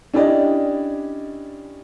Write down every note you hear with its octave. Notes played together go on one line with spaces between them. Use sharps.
C#4 D4 E4 G4 D5 D#5